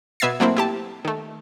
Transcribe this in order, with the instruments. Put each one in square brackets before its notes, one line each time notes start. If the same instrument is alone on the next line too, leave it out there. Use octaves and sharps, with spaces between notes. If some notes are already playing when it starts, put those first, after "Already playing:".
[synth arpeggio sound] B2 B3 E5 G#6 A6 C7
F#3 A3 A#3 C4 E4
E4 G4 A5
D#3 A3